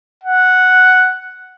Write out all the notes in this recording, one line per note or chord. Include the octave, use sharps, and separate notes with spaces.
F#5